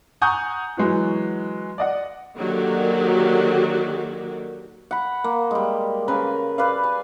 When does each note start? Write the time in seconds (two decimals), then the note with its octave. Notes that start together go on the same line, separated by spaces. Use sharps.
0.21 F#5 G#5 A#5 C#6 D#6 G6
0.77 E3 F#3 G#3 B3 F#4
1.78 D5 D#5 F#5
2.38 D3 D#3 F#3 A#3 F#4 G4
4.91 F#5 B5
5.24 A#3
5.51 G3 G#3
6.08 C#3 A#4 B4 G#5
6.58 B4 D5 F5
6.84 G#5